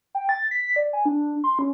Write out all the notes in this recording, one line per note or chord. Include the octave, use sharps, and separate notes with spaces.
G5
A6
B6
D5
G#5
D4
C6
C#4